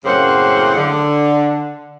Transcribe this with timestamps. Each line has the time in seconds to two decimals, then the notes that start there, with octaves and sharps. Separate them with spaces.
0.05 F#2 A2 C#3 A#3 C4 F#5
0.75 D3